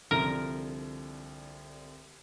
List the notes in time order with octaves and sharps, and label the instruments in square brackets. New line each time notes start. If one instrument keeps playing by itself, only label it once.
[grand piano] C2 D3 F3 [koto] A#4